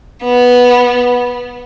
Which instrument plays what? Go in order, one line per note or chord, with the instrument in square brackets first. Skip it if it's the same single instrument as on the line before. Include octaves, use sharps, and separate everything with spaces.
[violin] B3